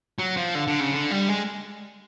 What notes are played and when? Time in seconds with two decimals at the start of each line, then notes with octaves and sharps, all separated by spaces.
0.19 F#3
0.37 F3
0.55 D3
0.67 D3
0.80 C#3
0.92 D3
1.11 G3
1.29 G#3